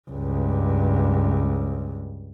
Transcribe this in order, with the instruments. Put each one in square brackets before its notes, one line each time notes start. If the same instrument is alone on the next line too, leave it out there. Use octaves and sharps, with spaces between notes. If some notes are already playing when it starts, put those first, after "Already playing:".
[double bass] C#2 G2